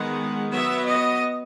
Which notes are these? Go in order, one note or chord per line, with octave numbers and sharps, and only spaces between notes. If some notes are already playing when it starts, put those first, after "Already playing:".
Already playing: D#3 G#3 B3 F#5
F#3 B3 E5
D#5